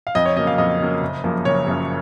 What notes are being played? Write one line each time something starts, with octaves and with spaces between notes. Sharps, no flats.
F5
F2 D#5
C#5
C#3 F#3 A#3 D#5
F5
F2 D#5
C#3 F#3 A#3
F#1
F#2 C#3 F3 A#3
F#1 C#5
F#2 C#3 F3 A#3